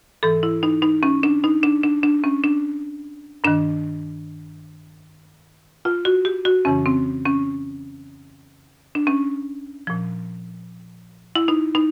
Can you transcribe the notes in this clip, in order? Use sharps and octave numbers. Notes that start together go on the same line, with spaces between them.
G#2 E3 A4
E4
D#4
D#4
C#4
D4
D#4
D4
D4
D4
C#4
D4
G2 D#3 D4
F4
F#4
G4
F#4
F2 C#3 E3 C#4
C4
C#4
D4
C#4
A#2 F3
E4
D#4
D#4